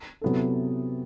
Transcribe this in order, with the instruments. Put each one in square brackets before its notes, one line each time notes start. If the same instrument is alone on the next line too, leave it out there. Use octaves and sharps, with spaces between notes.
[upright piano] C3 F#3 B3 E4 A4